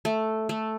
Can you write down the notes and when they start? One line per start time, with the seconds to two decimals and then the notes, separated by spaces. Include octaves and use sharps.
0.05 A3
0.49 A3